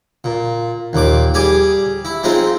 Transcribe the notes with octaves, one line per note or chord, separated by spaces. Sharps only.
A#2
D#2 A#2 D6
G3 G#4 G#5 D6
E4
G#3 C4 D#4 F4